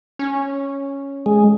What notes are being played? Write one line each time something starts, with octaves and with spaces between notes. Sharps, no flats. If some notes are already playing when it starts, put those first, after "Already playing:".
C#4
G#3